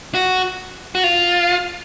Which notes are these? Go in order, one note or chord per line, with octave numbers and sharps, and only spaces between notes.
F#4
F#4
F4